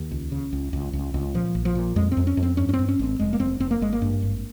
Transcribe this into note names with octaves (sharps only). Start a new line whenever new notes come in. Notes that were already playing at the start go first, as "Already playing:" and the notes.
Already playing: D#2
C#2
C#3
C#2
C#2
C#2
C#2
A#2 F3
A#1
F3
A#2
F2 G#3
C4
F2
C#4
F2
C4
G2 C#4
C#4
C4
G2
C#4
G#1 C4
F1 G#3
A#3
F1 C4
F1 C4
A#3
G#1 G#3
A#3
G2
G#1